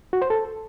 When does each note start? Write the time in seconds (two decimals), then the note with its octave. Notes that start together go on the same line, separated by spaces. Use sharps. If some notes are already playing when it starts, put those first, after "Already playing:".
0.13 F#4
0.22 C5
0.30 A4